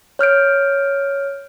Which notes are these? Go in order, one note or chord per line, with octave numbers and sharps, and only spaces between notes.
C#5 F6 G6 D7